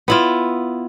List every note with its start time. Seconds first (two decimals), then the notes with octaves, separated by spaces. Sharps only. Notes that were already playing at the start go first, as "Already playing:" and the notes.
0.08 B3 E4 F4